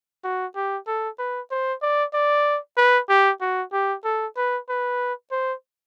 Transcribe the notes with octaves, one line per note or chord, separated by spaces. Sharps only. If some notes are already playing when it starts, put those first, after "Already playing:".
F#4
G4
A4
B4
C5
D5
D5
B4
G4
F#4
G4
A4
B4
B4
C5